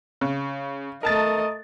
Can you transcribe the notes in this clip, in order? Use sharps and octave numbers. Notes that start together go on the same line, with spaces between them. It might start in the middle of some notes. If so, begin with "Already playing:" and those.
C#3
A3 A#4 D#5 A5 A6